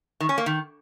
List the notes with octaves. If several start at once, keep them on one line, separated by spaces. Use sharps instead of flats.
D#3
C#4
A#3
D#3